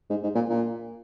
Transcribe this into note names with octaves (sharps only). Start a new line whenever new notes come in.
G#2
G#2
A#2
A#2